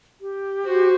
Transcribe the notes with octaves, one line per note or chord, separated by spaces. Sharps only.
G4
F#4 C5